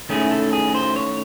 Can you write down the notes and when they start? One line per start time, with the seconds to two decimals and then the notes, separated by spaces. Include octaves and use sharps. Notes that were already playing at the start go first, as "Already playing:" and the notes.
0.09 D#3 A3 C#4 E4 G#4
0.31 A4
0.53 G#4
0.75 C5
0.96 C#5